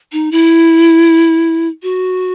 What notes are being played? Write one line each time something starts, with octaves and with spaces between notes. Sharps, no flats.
D#4
E4
F#4